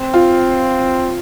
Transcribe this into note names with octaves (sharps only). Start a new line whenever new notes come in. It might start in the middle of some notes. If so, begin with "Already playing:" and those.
Already playing: C4
F4